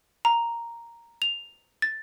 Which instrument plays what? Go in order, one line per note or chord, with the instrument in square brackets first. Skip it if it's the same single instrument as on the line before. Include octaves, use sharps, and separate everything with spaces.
[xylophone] A#5
F7
A6